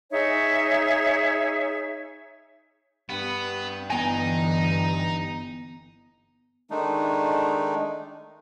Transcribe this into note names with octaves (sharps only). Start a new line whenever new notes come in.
D#4 G#4 C#5 E5
G2 B3
G1 E3 B3 D#4 G5 G#5
D#3 G#3 A3 D4 D#4